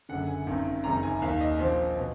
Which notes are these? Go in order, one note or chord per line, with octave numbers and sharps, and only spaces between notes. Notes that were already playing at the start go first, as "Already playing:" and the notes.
F#1 F#2 D3 F#5
G#5
G#1 F#2 D#3
F#1 F2 D#3 A#5
G#5
D#2 D#3 F5
D#5
A#1 A#2 F3
B2